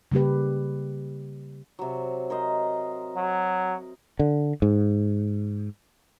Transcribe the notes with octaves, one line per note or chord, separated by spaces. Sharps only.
C#3 G3 A#3 G4 B4
C3 F#3
A#4 C5 D#5
F#3
D3
G#2